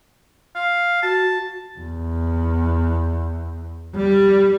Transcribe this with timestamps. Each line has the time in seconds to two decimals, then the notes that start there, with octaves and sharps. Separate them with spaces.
0.55 F5
1.03 F#4 A5
1.79 E2
3.95 G3